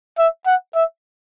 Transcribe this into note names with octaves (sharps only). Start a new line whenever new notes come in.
E5
F#5
E5